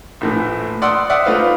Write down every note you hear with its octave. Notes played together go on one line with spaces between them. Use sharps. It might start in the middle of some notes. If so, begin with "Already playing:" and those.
A#1 A2 E3
D5 F#5 C6 D#6 E6
D5 E5 F#5 D#6
A3 D#4 F4 B4 C5 F5